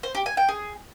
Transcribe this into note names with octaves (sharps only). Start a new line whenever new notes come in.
C5
G4
G#5
G5
G#4